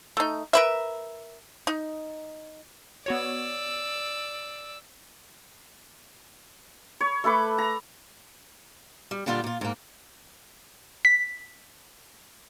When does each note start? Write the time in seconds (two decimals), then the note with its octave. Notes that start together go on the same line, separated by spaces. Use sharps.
0.17 A3 D#4
0.53 A#4 B4 E5
1.67 D#4
3.06 B3 F#4 C#5 D5 E6
7.01 C#5
7.24 A3 A4 B4 D6
7.58 A#5
9.11 G3
9.26 A#2 D3 G3 F4 D5
9.44 A#2 F4
9.61 G#2 A#3
11.05 B6